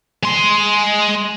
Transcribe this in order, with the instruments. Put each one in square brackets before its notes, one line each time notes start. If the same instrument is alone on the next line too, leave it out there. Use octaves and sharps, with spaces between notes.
[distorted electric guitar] G#3 C6